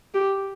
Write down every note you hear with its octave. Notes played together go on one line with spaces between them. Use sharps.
G4